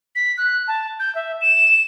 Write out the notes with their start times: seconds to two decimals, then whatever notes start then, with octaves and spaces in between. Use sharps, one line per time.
0.16 B6
0.38 F#6
0.68 A5
1.00 G6
1.15 E5
1.41 E7